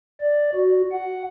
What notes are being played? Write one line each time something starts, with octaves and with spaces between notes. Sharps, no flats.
D5
F#4
F#5